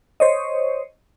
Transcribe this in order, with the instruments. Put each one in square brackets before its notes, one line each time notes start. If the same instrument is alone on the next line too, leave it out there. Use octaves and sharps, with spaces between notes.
[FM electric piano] C5 C#5 D#5